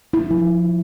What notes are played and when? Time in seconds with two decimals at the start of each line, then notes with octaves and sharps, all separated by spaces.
0.13 E4
0.31 F3